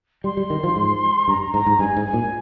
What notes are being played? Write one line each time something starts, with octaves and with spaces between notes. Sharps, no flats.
G3 C6
G3
D#3
F3
G#2
G2 A#5
G#2 A#5
G#2
G2 G#5
G#2
G#5
A#2